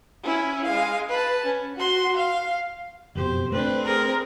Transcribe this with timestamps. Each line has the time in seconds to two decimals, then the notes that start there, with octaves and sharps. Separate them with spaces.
0.24 C#4 E4
0.65 G#3 F5
1.10 B4 A5
1.46 C#4
1.76 F#4 C6
2.17 F5
3.15 F#1 F2 B2 G4 C5
3.52 A3 C4 D4 B4
3.86 G#4 A#4